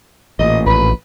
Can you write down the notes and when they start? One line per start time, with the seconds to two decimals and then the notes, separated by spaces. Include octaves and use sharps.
0.39 A1 A#2 D#5
0.66 A#1 B4